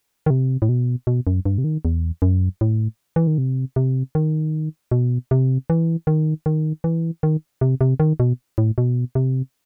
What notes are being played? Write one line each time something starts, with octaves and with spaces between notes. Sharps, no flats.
D#3
C3
A2
B2
B2
F#2
G2
C3
D#3
E2
F#2
A2
E3
D#3
C3
C3
D#3
B2
C3
E3
D#3
D#3
E3
D#3
C3
C3
D#3
B2
A2
B2
C3